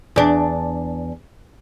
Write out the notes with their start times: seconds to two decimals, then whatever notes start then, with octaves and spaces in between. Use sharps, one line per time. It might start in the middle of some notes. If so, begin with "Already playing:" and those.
0.16 E2 D4